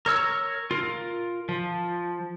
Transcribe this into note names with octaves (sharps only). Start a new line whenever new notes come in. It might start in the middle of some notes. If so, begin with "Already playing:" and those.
A#4 C#5 E6
F4 A#4
F3